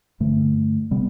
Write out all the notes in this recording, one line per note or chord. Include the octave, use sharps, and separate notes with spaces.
G2 D3 A3
C3 G3 B3